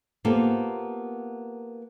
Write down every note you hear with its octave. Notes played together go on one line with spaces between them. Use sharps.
A#3 B3 F4 G4 A4 C5